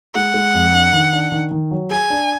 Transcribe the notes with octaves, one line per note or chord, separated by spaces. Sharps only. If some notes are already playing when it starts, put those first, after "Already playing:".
G#3 F#5
G#3
F2
D4
D#3
D4
D#3
D#3
F#3
G#4 G#5
D4